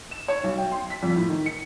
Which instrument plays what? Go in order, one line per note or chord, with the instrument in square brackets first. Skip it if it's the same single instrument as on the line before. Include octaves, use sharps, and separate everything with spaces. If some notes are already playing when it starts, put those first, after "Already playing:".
[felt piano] E7
C#5
B1
G5
C6
B6
F2
A2
D#3
C#7